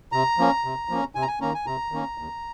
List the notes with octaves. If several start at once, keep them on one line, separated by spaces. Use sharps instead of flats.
C3 A#5
F3 A#3 C#4
C3
F3 A#3 C#4
C3 G#5
A#5
G#5
D#3 A#3 C#4 A#5
G#5
C3 A#5
D#3 A#3 C#4
D#2